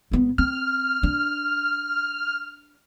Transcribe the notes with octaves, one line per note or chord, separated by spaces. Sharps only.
G#1 B3
C4 F6
D4